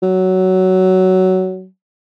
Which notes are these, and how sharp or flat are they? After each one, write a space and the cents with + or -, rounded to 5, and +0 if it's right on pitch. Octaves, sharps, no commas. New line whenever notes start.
F#3 +15